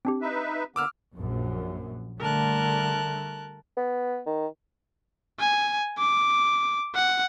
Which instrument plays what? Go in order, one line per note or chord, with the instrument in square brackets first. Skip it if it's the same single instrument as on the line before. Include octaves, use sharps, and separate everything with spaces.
[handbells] C4 D4 G4
[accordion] D#4 B4 E5
[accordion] D3 A#3 B3 [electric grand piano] D6 E6 F6
[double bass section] A#1 F#2
[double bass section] D3 G3 A3 [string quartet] A#4 A5 F#6
[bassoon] B3
D#3
[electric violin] G#5
D6
F#5